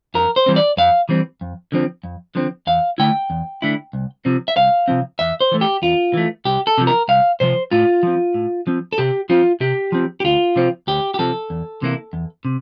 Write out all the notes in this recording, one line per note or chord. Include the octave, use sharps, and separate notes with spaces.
F2 A#4
C5
E3 G3 C4
D5
F2 F5
E3 G3 C4
F2
D3 F3 C4
F2
D3 F3 C4
E2 F5
D3 A3 E4 G5
E2
D3 A3 E4
C2
C3 F3 C4
E5
C2 F5
C3 F3 C4
E2 E5
C5
E3 A3
G4
E2 F4
E3 A3
C2 G4
A4
C3 F3
A#4
C2 F5
C3 F3 C5
A2 F4
F3 C4
A2
F3 C4
A4
C3 G4
F3 C4 F4
C3 G4
F3 C4
G4
D2 F4
C3 F3 C4
D2 G4
G4
C3 F3 C4 A4
E2
C3 E3 A#3 E4
E2
C3